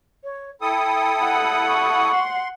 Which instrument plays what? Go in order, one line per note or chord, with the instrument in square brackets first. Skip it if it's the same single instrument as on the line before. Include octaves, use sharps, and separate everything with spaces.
[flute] C#5
[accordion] E4 A4 D#6 [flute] G5
[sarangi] F#5
[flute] C#6
[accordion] C6